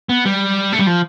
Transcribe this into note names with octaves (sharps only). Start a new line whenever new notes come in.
B3
G3
A3
G3
F3